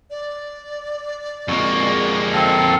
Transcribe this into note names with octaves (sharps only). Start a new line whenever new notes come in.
D5
F2 C3 G#3 A#3 F#4
C4 A4 F5